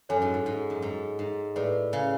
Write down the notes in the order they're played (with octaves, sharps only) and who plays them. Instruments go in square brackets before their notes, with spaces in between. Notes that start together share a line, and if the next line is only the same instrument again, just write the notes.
[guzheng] F#2 [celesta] A4 C#5 G#5
[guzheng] G#2
G#2
G#2
F#2
G#2
G#2
[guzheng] A2 [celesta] G#4 B4 D5
[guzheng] C#3